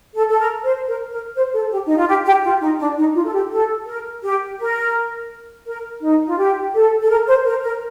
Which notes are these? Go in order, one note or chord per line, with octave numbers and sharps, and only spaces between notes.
A4
A4
A#4
C5
A#4
A#4
C5
A4
G4
D#4
F4
G4
G4
F4
D#4
D4
D#4
F4
A4
G4
A4
A#4
G4
A#4
A#4
D#4
F4
G4
A4
A4
A#4
C5
A#4
A#4